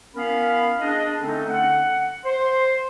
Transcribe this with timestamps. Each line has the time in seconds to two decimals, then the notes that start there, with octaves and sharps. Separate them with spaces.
0.15 B3 C#4 E4 A#4 F5 B5
0.80 D4 G#4 D#5
1.20 D3 A3 C4 C#4 D#4 A4
1.49 F#5
2.25 C5 C6